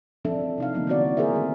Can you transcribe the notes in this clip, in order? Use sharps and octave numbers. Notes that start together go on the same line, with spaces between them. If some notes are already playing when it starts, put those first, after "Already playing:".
E3 F3 C4 D4 A4 E5
C3 D#4 F5
D3 E3 F3 G3 A#3 B3
E3 B3 C4 F#4 C#5 D5
A#3 G#4 A#4 C5 E5
D#3 E3 A3 C4